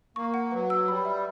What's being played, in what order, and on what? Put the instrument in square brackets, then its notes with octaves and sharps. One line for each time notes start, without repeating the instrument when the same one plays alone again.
[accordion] A#3 [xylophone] C#6
[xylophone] F#5
[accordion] F#3 [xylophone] B4
[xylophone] E6
[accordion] G3 [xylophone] B5
[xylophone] E5